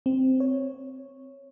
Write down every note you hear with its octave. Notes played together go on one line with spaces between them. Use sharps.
C4
C#5